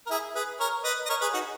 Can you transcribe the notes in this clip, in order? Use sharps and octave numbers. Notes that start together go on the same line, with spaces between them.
A#4
E4 G#4
G#4 B4
A#4 C#5
B4 D#5
D#5
A#4 C#5
G#4 B4
D#4 F#4